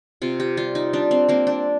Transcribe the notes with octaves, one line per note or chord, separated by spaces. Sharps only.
C3 F4
G4
G3 F4
D#4
G3 D4
C4
A#3 C4
D4